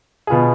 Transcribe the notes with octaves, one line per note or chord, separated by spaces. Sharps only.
B2 B3 F4 G#4